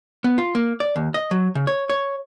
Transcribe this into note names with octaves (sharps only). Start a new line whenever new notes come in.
B3
F4
A#3
D5
D#2
D#5
F#3
C#3
C#5
C#5